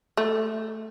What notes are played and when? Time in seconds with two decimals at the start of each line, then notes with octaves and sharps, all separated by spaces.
0.17 A3